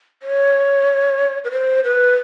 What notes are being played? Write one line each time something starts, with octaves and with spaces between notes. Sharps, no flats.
C#5
B4
C5
B4